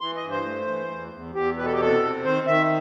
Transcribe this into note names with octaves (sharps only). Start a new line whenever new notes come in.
E3 C6
D#5
G2
C5
A3
E3
E2
E2
E2 G4
B2 B4
A4
G4
C3 A4
C4
D#3 C5
D#3 E5